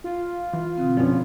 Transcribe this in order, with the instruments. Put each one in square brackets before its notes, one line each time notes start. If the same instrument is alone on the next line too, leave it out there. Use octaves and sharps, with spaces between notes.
[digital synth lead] F4
[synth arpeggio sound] E3
[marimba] B2 D3 C4
[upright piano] A#1 B3 C#4 [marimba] F3